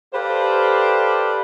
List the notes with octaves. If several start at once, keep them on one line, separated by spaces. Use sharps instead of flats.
G4 A4 B4 C5 D5 F5